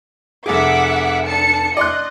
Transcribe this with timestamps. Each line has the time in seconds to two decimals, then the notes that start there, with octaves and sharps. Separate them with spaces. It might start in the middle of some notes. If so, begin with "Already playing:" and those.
0.46 F1 G#4 E5 F#5 D6
1.25 D4 A5 C#7
1.77 D5 D#5 C6 F#6